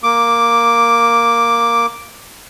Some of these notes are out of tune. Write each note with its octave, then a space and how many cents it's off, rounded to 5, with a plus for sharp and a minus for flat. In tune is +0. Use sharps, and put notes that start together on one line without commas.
A#3 +0 D6 +0